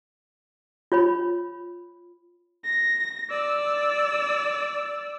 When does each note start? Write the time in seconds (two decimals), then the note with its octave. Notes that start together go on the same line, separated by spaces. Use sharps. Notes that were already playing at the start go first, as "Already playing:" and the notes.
0.92 F4 C#5 B5
2.65 A#6
3.30 D5 E6